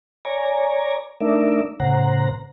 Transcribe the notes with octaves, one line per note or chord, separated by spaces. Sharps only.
C#5 D5 G#5 A#5
A3 D4 D#4 A#4 D5 E5
A2 C#3 C5 F#5 A#5